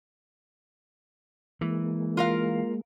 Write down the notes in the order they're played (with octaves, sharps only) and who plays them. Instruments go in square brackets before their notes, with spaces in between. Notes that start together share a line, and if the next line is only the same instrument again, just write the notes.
[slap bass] E3 [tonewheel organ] G#3 A#3
[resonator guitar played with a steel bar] F4 A#4 F5